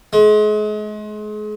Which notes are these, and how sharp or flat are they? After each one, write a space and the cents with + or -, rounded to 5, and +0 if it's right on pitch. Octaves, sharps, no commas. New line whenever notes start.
G#3 +35